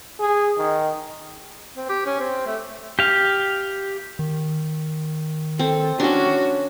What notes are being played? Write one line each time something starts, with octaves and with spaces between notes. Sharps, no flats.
G#4
D#3
C4
G4
C#4
C4
A3
G4 F5
D#3
C4 A4
C#4 D4 F#4